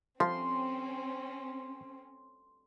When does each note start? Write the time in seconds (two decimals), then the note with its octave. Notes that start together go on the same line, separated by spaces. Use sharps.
0.20 F3 C4 C#4 C6